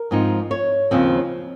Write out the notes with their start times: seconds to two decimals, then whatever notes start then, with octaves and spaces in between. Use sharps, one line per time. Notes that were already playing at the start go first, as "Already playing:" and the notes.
Already playing: A#4
0.11 G#2 F3 C4 D#4
0.51 C#5
0.91 D#2 C#3 F3 C4